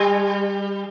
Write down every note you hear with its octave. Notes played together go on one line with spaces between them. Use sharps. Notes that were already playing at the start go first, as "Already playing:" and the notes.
Already playing: G3